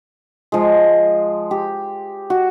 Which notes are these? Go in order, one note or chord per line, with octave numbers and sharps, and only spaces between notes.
F3 G#3
G4
F#4